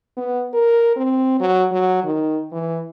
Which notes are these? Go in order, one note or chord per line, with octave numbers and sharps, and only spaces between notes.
B3
A#4
C4
F#3
F#3
D#3
E3